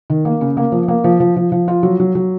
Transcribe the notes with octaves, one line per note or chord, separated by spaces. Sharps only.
D#3
A#3
C#3
A#3
F3
A#3
F3
F3
F3
F3
F4
F#3
F#3
F#3